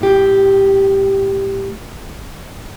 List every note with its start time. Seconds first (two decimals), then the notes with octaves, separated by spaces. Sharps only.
0.01 A2 G4